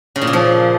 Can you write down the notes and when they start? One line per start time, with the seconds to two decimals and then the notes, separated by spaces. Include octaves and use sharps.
0.16 C#3
0.22 A#2
0.27 C#3
0.33 F3